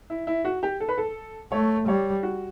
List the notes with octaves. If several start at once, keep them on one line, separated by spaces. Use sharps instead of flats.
E4
E4
F#4
G4
A4
B4
A4
A3 C#5
G3 C#5
F#4